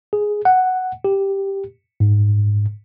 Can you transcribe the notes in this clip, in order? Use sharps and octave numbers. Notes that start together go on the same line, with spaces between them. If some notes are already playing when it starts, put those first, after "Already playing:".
G#4
F#5
G4
G#2